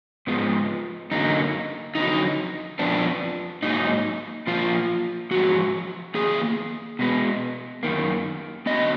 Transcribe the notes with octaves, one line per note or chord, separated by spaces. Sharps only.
G#2 F3 G#3 B3
F#2 D3 F#3 A#3 D#4
F2 D3 F#3 D#4
F2 F3 B3 D4
G#2 F#3 A#3 D#4
A#2 F3 A#3 F4
G#2 F3 G#3 F#4
F2 D#3 A#3 G#4
B2 G#3 B3
F#2 D#3 A#3
D3 F#3 B3 D#5